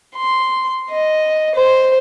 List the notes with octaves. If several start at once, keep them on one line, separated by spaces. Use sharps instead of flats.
C6
D#5
C5